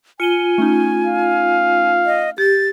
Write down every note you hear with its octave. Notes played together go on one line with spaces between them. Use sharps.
F4 G#5 C#7 D#7 G7
A3 C#4 D#4
F5
D#5
G4 A6